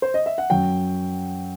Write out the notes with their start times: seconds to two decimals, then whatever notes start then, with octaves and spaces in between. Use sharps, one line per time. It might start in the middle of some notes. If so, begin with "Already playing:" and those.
0.02 C5
0.14 D#5
0.26 E5
0.38 F#5
0.50 F#2 F#3 G5